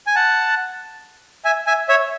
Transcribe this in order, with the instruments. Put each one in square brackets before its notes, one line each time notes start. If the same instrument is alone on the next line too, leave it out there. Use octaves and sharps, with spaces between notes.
[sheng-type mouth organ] G#5
F#5 A5
E5 G#5
E5 G#5
C#5 E5